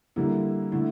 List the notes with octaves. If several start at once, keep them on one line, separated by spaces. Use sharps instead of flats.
D3 G3 A#3 E4
D3 A3 E4